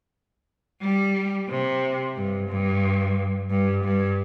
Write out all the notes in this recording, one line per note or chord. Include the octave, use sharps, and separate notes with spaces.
G3
C3
G2
G2
G2
G2